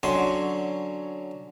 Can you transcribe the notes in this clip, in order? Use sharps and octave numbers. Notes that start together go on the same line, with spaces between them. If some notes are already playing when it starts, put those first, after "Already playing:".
D3 F#3 C#4 C6